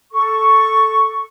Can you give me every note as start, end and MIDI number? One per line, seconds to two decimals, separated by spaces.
0.12 1.23 69
0.12 1.23 85